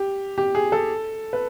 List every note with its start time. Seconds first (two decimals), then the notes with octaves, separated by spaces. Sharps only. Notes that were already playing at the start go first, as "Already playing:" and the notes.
Already playing: G4
0.38 G4
0.55 G#4
0.72 A4
1.33 B4